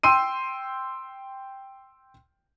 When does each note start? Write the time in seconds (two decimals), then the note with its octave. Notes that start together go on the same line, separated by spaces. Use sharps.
0.03 G5 C6 E6 D#7